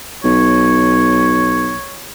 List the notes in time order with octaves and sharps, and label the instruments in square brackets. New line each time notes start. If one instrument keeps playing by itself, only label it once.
[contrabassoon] B1 [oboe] C#5